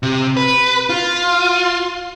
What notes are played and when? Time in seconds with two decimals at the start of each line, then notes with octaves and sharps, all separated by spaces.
0.03 C3
0.37 B4
0.90 F4